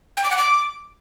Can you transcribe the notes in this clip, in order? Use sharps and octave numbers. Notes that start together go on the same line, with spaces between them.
G5
D6
F#5
D6